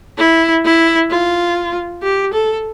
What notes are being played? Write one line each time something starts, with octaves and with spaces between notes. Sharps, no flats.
E4
E4
F4
G4
A4